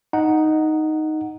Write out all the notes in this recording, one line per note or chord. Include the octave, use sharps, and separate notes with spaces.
D#4 F#5